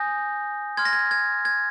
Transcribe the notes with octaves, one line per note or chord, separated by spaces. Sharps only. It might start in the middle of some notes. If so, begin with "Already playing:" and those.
Already playing: G#5 D#6 G6 A#6
C6 F6 G#6
A#6
G#6
G#6
G#6